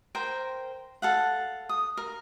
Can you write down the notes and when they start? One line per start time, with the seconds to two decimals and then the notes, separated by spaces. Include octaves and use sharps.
0.15 A#4 C5 G5
1.02 A4 F5 F#5
1.69 D#6
1.97 A#4